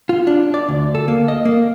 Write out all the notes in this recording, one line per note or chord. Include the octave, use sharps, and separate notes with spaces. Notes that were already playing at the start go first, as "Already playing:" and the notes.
F4
D4
D5
D2
A4
A#3
D#5
A#3